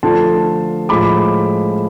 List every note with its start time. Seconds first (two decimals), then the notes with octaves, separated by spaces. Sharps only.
0.03 D3 F3 A3 D4 F4 A5 C6
0.89 A2 F3 G#3 B5 D6